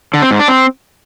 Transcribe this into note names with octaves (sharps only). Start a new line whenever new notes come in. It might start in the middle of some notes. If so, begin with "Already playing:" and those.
D3
C4
G#2
D4
C4